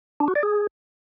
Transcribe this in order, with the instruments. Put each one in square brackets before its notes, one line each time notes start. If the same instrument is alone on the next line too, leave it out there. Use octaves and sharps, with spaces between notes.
[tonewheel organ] D4
F#4
D5
G#4